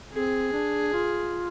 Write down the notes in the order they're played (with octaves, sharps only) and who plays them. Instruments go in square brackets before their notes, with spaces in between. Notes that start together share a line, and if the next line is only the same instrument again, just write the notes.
[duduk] C4 [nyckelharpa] G#4
[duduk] D4
F4